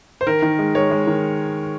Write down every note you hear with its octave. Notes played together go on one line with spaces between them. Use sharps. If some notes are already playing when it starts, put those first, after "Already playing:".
C5
D#3 A#4
D#3
G#3
G#3 C#5
G#3
D#3